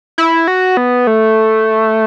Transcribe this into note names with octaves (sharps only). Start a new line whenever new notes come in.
E4
F#4
B3
A3